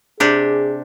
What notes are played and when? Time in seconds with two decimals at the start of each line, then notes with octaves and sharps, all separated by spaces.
0.20 C3 D4 G4 G#4